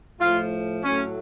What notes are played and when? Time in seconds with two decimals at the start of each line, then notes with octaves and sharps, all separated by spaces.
0.20 A2 F3 A3 F4
0.84 A2 F#3 A3 C#4